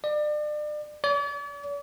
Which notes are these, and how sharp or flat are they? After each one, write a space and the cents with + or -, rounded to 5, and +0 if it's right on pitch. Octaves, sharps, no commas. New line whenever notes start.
D5 +35
D5 -45